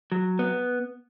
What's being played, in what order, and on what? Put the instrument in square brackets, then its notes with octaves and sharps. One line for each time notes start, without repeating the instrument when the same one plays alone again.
[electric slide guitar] F#3
B3